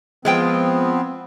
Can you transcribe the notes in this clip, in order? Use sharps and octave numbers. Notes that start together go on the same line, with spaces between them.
F3 G#3 B3 C4 F4 G5